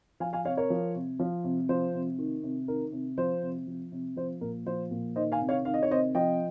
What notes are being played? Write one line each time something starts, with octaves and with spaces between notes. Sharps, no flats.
F3 F5 G#5
F5 G#5
C3 C#5 F5
A#4 C#5
F3
C3
F3
C3
F3 C5
C3
D#3
C3
D#3 A#4
C3
F3 C5
C3
F3
C3
F3 C5
A#2 A#4
F3 C5
A#2
D#3 C5 D#5
F5 G#5
C3
C#5 F5
D#3 F5
D#5
C#5
C3 C5 D#5
F3 D#5 G5